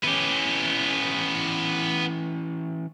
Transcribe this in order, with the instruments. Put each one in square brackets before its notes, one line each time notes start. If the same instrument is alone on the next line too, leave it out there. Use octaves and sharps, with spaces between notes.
[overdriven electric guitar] E3 C#4 [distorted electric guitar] B3 G4